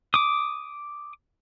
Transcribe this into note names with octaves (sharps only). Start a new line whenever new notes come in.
D6 D#6